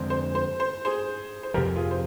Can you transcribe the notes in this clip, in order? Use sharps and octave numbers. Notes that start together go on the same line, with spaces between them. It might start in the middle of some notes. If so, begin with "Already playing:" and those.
Already playing: F2 D3 G#3 C4 C5
C5
C5
C5
G#4 C5
C5
F2 C3 F3 G4 A#4
F4 G#4
C5